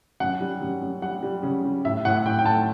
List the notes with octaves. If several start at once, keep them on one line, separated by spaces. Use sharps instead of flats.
F#2 F#5
G3
F#2
F#2
G3 F#5
G3
C#3
G3
A2 E5
A2 F#5
A2 G5
G5
A3 A5